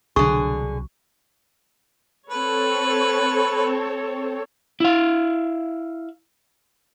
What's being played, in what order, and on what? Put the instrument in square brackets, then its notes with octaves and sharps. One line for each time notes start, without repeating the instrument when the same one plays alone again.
[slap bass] C2 B2 F#3 [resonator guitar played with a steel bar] D3 G#4 [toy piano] C#6
[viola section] C4 A4 C#5 [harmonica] B4
[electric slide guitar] E4 F5